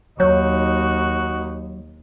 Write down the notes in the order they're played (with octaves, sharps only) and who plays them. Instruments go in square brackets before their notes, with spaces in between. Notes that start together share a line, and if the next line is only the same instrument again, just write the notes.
[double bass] D#2 D#4 [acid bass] F#3 [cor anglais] F#4 [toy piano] C#5